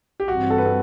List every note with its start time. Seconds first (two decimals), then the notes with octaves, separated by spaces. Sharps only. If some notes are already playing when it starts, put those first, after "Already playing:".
0.20 G4
0.28 G2 E3 G3 C4 F#4
0.50 A4
0.58 B4
0.66 A4